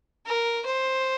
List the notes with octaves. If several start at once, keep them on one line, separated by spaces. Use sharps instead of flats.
A#4
C5